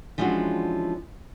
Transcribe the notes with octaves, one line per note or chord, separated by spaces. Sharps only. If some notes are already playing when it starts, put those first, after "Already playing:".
E3 F3 G#3 C#4 D4 F#4